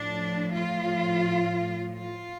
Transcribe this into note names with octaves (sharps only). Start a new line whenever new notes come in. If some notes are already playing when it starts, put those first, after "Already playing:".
Already playing: A2 F3 D4
F4
F4